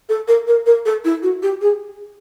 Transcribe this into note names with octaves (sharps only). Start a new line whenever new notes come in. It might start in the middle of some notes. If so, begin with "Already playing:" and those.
A4
A#4
A#4
A#4
A4
E4
F#4
G4
G#4